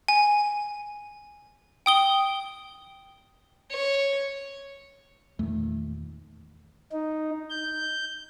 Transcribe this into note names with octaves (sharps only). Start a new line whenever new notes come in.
G#5
G5 D#6 G7
C#5
E2 A#2 D#3 A3
D#4
G6